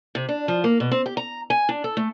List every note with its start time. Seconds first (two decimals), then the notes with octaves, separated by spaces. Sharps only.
0.15 C3
0.29 D4
0.48 F3
0.64 A#3
0.80 B2
0.92 C4
1.06 G4
1.17 A#5
1.50 G#5
1.69 D4
1.84 A4
1.97 A3